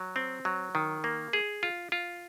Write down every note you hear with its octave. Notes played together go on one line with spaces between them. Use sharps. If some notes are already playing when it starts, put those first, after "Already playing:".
Already playing: F#3
C4
F#3
D#3
A#3
G#4
F4
F4